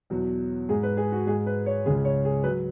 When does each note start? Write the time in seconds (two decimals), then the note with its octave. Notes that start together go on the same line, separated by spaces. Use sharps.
0.10 E2 B2 F#3
0.69 G#2 G#3 G#4
0.83 B4
0.97 G#4
1.12 F#4
1.27 G#2 G#3 G#4
1.46 B4
1.66 C#5
1.85 C#2 C#3 G#3 G#4
2.05 C#5
2.25 G#4
2.43 F#3 B4